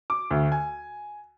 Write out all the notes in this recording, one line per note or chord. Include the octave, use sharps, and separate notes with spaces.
D6
D2
G#5